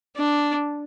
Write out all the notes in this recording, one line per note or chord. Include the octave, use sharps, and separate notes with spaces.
D4